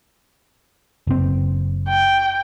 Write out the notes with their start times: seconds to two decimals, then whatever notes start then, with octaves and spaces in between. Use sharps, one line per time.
1.07 F#1 C4
1.89 G5